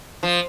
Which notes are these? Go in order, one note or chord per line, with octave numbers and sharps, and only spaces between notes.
F3